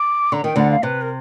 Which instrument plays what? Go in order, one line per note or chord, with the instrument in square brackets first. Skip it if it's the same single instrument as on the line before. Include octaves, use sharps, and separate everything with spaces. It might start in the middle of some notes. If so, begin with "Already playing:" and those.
Already playing: [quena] D6
[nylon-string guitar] D3 [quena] A#5
[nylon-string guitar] D#3 [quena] G5
[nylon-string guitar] D2 D3 [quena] F#5
[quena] F5
[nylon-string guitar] C3 [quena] B4
[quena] A#4